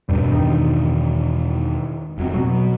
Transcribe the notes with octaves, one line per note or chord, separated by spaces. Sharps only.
E2 G2 B2 D4
D#3
F1 F#3 C4
B2 F#3